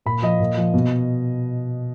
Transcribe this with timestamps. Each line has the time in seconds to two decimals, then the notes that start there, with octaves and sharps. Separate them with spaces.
0.06 A#2 B5
0.22 F3 D#5
0.40 A#2
0.57 F3
0.74 B2